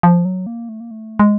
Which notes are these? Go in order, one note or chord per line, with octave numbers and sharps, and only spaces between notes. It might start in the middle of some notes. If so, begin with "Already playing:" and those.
F3
F#3
A#3
A3
A#3
A3
G#3